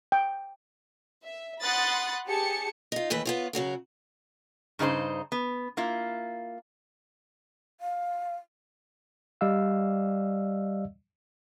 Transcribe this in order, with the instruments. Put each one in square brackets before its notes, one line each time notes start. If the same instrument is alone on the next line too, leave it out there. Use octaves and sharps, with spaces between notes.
[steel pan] G5
[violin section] E5
F#5 B5 C6 D#6 F#6 A6
G4 G#4 A5 C#7
[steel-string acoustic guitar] D#4 F4
D#2 E3 A3 B4
B3 F4 C#5
C#3 F#3 F#4 A#4
[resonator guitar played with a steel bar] G2 C#3 D#4 F#4 C5
B3
A#3 E4 F4
[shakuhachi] F5
[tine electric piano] G3 D5 D#5 F5 E6